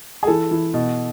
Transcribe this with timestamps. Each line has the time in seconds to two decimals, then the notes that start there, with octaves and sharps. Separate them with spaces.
0.23 G#4
0.27 E3 A4
0.51 E3
0.74 B2